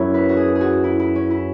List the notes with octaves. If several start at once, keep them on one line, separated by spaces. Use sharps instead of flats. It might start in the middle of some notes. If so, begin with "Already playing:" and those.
Already playing: F#2 F#3 E4 C#5
B4
F#4
G#4
G#4
F#4
E4
E4
C#4
E4